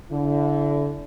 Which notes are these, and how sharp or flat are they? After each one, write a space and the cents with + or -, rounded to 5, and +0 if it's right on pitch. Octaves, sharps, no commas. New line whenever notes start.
D3 -30 E4 +0